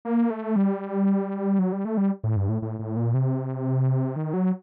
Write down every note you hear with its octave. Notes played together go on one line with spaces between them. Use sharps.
A#3
A3
G3
F#3
G3
A3
G3
A2
G2
A2
A2
A2
A#2
C3
D#3
F#3